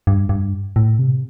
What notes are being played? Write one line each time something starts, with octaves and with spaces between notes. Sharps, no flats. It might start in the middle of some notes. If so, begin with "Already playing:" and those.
G2
G2
A2
C3